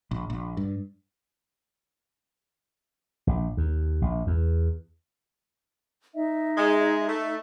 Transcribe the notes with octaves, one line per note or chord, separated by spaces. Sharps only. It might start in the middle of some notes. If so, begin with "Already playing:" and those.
A#1
A#1
G2
A#1
D#2
A#1
E2
D#4 D#5 E5
G#3
A3